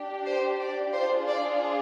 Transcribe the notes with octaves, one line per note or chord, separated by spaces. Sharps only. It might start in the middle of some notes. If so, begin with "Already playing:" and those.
Already playing: D4 G4
C5
D5
D4 F4 G#4 C5
D5